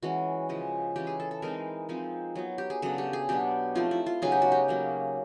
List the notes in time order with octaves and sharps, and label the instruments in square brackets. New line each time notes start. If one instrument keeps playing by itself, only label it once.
[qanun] E3 G#3 C#4 F#4
C#3 F3 G#3
E3 G#3 C#4 G4
G#4
A4
A4
E3 G#3 C4 D#4 A#4
F3 G#3 C4 D#4
F#3 B3 D#4
G4
G#4
C#3 F#3 B3 D4 A4
G4
G#4
B2 F#3 B3 D4 G4
F3 A3 C4 D#4 F4
E4
F4
C#3 F#3 B3 D#4 G#4
G4
F#4
G4
F#3 A#3 C#4